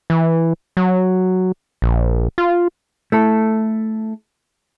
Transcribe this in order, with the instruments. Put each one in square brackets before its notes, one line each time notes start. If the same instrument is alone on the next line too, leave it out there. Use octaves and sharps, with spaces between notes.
[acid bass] E3
F#3
A#1
F4
[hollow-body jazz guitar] A3 E4 A4